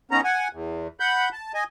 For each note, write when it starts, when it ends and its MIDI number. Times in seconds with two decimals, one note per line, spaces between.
0.11 0.21 51
0.11 0.21 59
0.11 0.21 61
0.11 0.21 82
0.24 0.48 78
0.24 0.48 80
0.53 0.88 40
1.00 1.29 78
1.00 1.29 83
1.00 1.29 91
1.32 1.52 81
1.54 1.64 75
1.54 1.64 80